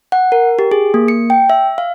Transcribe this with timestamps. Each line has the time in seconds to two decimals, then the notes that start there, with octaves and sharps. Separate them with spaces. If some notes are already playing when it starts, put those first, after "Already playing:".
0.12 F#5
0.32 A#4
0.59 G4
0.72 G#4
0.94 A#3
1.08 C#7
1.30 G5
1.50 E5
1.78 F5